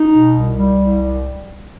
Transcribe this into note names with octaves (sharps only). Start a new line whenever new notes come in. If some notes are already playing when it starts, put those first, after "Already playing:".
Already playing: D#4
B2
C2
G3
C2
G3